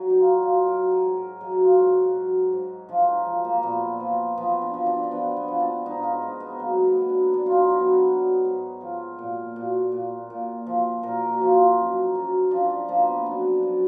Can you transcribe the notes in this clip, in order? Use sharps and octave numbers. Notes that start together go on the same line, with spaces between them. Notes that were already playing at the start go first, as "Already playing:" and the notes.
Already playing: F#3
D#4
F4
F#3
F4
F#3 A#4
G#4
G#2
A#4
F#3 G#4
F#4
F4
F#4
G#2
F#3
G#2
F3 F4
D#4
F3
A#3
A#2 B3
F3
F3 B3
D4
F3
D4
D4
F3 B3
B3
F3
D4
G#2 D#4
F4
D#4
G#2
B3
F#3 A#3
B3
F#3 B3
D4
F#3 D4
F4
D#4
F#3 D#4
B3
D4
F#3 D#4
G#2
F3 F4
A#2
A#2 F#4
A#2
A#2
F3
A#2 A#4
F#4
F3 D#4
F4
F#2
F#2
F3 D4
D4
F3 A#3
B3
F#2 D4
F#2